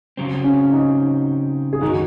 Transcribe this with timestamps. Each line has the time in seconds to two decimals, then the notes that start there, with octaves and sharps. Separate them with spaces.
0.17 C#3 F#3 C4
0.44 C#4
0.72 D#4
1.73 G#4
1.81 F#2 D#3 F#3 D#4 F#4